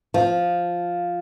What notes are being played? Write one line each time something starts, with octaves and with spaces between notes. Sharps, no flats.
F3